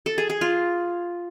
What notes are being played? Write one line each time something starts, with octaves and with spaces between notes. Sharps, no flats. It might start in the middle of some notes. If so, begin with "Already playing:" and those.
A4
G#4
G#4
F4